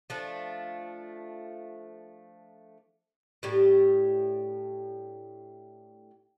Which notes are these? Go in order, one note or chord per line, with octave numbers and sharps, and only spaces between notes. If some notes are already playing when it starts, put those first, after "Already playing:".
F3 A3 D4
A2 G3 D4 G4